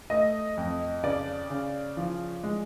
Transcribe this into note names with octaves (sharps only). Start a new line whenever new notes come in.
A3 D#5
F2
C#3 D5
C#3
F3
G#3